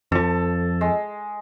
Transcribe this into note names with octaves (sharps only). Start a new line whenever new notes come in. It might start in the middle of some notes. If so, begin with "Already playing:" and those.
F2 F3 A4
G#3